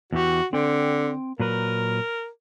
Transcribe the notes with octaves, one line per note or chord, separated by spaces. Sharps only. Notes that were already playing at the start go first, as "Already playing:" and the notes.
E2 E3 F#4 G4
D3 C4 G5
A#2 F#3 A#4 B4